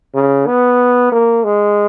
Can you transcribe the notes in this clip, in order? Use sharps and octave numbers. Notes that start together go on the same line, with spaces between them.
C#3
B3
A#3
G#3